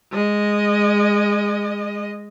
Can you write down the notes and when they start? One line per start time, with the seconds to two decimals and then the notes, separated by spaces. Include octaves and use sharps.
0.11 G#3 D#5